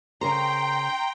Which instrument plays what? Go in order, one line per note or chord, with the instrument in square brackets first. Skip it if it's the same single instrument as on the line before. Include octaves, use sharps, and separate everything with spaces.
[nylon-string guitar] C#3 A#4 C5 [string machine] G5 [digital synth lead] A#5 [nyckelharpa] C6